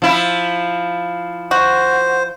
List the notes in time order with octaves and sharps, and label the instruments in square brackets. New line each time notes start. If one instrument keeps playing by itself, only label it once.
[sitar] F3 E4
[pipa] F#4 [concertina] C5